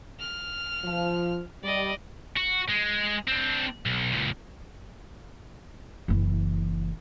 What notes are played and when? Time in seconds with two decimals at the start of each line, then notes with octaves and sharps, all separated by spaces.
0.20 F6
0.84 F3
1.63 G3 D5 D#5
2.37 F#4
2.69 G#3
3.28 C4 D4
3.86 B1
4.12 C#2 A#2
6.08 F#1 E3